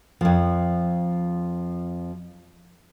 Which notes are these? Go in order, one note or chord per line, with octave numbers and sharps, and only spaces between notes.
F2 F3